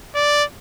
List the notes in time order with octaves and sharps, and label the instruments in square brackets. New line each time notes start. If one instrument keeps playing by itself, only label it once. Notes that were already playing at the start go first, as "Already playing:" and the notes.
[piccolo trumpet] D5